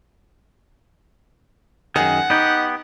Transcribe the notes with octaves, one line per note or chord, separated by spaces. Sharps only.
F#2 D#3 G#4 F#5
B3 D#4 G4